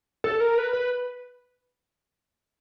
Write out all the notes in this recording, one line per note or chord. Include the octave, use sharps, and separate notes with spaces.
A4
A#4
B4
B4